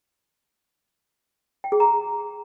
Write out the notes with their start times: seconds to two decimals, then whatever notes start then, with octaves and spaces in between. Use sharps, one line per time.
1.64 G5
1.72 G#4
1.80 A#5